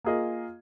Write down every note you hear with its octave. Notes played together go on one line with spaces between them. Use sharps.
A#3 F4 G#4 D#5